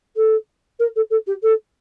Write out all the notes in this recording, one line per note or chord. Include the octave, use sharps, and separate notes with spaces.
A4
A#4
A4
A4
G4
A4